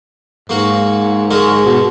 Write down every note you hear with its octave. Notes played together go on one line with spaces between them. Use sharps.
G#2 A#3 F#4
G#3 F#4 A#4
B2